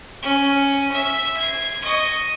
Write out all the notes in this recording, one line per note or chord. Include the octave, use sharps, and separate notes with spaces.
C#4
E5
G#6 C7
D#5 C#6